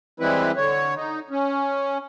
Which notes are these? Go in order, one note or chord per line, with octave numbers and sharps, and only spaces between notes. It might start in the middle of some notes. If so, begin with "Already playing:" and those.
E3 G3 G#3 C4 E4 B4
D3 C#5
D#4
C#4